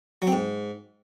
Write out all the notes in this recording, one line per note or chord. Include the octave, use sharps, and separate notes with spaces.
F#3
C4
G#2